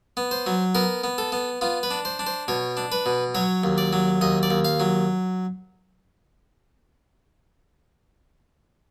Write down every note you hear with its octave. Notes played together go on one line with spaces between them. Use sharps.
B3
C5
F#3
B3 A#4
B3
A4
B3
B3 F4
B4
D4
C5
D4
C5
B2 C#5
D4
B4
B2
F#3 C#5
D#2
D5
F#3
D#2 D#5
D5
D#2
F5
F#3